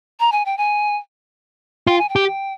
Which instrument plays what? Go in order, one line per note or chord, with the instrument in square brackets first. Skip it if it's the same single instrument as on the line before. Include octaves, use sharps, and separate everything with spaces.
[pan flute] A#5
G#5
G5
G#5
[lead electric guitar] F4 [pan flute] G5
[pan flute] G#5
G5
[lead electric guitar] G4